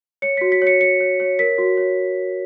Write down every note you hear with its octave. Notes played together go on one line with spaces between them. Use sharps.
C#5 C#7
F#4 B6
B6
C#5
C#7
C#5 C#7
C#5
C#5
A#4 B6
F#4
C#5